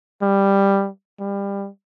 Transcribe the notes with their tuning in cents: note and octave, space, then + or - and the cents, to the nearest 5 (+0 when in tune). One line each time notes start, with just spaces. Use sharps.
G3 +10
G3 +25